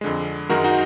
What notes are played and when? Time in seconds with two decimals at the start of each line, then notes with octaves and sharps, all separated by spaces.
0.01 F2 D3 G#3
0.49 F#2 D#3 G#3 F#4 A#4
0.64 D#4 F#4